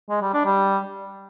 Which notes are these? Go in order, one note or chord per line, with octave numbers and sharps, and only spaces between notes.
G#3
G3
D4
G3